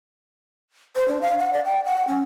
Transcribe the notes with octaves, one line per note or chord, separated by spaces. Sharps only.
C5
D4
F5
F#5
D5
G5
F#5
C#4